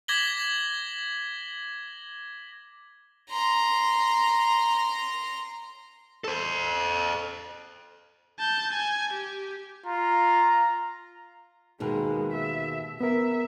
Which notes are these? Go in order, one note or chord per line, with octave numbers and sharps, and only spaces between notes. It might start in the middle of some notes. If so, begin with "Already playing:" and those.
D6 G#6 A#6 B6 F#7 G7
A#5 C6
A4 C5
A5 G6
G#5
G4
F4 A#5
D#2 B2 G#3 A#4
E5
B3 A#4 E5